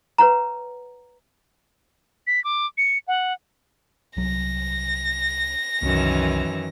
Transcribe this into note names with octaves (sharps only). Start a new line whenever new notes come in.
B4 C#5 F#5 A#5
B6
D6
C#7
F#5
C2 F#3 A#6
C2 F#2 D#3 E3